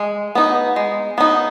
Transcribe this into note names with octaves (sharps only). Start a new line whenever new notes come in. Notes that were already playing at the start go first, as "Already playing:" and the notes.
Already playing: G#3
B3 D#4
G#3
B3 D#4